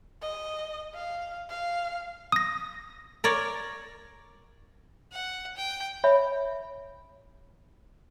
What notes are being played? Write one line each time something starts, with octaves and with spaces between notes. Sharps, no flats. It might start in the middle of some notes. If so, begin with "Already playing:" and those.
D#5
F5
F5
D#6 A#6
A#4 C#5 D5
F#5
G5
C#5 E5 B5